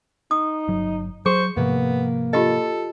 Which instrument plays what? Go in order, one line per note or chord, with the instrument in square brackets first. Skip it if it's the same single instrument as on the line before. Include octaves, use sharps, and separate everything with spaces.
[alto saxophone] D#4 [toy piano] D#6
[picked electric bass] G1 F#3
[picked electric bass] F#3 [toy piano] G#4 [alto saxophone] C5 [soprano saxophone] C#6
[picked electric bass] G#2 C3 F3 [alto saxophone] A#3 [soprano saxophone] B3
[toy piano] F4 G4 D#5 [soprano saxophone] A4